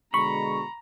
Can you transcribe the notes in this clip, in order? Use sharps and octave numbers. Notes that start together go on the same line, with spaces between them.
B2 D3 G#3 A#5 B5 C#6